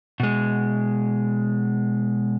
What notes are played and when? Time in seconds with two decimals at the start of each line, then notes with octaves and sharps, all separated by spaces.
0.20 B2 G#3